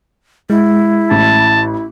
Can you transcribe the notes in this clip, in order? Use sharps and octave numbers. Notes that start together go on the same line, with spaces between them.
G#3 E4
A1 A5